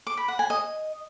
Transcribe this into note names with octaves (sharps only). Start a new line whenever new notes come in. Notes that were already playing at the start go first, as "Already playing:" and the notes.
D6
B5
F#5
G#5
D#5